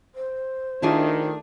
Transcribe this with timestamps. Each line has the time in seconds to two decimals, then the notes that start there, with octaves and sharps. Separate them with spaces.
0.15 C5
0.82 D#3 A3 D4 E4 F4 G#4